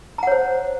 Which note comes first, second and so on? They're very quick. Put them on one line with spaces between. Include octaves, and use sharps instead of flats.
A#5 F#5 C#5 C5